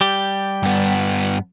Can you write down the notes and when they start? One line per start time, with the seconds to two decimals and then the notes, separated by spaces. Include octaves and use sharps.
0.01 G3 G4
0.63 G2 B3